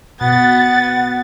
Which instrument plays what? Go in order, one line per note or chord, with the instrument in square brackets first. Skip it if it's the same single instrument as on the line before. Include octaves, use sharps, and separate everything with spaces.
[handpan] B2 [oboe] B3 [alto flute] F#5 [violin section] A6